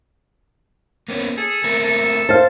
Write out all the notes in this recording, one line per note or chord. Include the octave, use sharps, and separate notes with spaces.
A#3 B3 C#4
G#4 A4
A3 C4 A#4
A4
C5 F5 A5